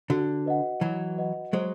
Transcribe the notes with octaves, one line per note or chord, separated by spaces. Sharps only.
D3 F#4
B4 D#5 F#5
E3 F#3 F#4
B4 D#5 F#5
F#3 G#3 C5